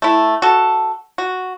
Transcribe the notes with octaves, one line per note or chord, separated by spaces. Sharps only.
A3 E4
F#4 A4
F#4